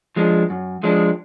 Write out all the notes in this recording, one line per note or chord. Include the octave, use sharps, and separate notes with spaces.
F3 G#3 D4
F#2
F3 G#3 D4